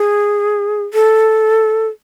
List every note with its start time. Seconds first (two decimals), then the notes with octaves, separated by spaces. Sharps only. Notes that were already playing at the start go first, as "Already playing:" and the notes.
Already playing: G#4
0.94 A4